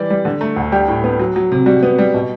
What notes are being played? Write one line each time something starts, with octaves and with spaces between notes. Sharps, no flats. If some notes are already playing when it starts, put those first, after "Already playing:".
Already playing: E3 G3 D5
G3
D3
A3
D2
G3 G4
A2
B3
F#3
F#3
C3
G3 F#4
B3
G3
B2